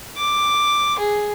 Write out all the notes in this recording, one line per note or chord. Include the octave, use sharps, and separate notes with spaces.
D6
G#4